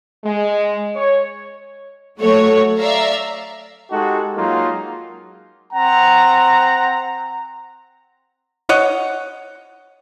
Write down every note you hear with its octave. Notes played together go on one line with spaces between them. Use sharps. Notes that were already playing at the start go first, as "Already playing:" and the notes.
G#3
C#5
F#3 A3 F#4 C#5
D5 E5 F5 A#5
G#3 D#4 F#4 G4 A4
F#3 G#3 A#3 D#4 F4
C4 F#5 A#5
C#5 D#5 F#5